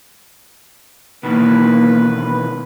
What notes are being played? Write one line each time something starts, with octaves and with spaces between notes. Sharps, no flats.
B2 D#3 E3 A#3 B4